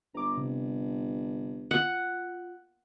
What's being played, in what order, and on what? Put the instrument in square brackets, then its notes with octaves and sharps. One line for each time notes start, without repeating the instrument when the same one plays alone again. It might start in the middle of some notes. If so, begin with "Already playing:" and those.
[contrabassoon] G1 [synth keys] A#5 D6
[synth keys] C3
[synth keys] F4 [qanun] F#5